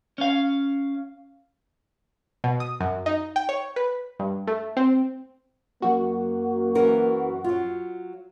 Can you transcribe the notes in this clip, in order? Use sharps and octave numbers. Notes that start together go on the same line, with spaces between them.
C#4 F5
B2
D#6
F#2
D#4
G5
C#5
B4
G2
A3
C4
F#2 A#3 F#4
E3 C#4 A#4
F#3 F4